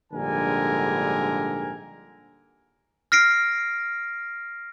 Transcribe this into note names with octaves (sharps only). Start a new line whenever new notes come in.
A#1 G#2 D3 G3 A#4 G#5
F6 A#6 C7 D7